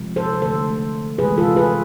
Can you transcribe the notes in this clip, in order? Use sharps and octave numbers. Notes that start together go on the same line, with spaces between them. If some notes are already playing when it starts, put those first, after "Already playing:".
Already playing: C3 F3 G#3
A4 C5
D3 A3 A4 C5
C3 E3 G#3 G#4 B4
F4 A4
G#4 B4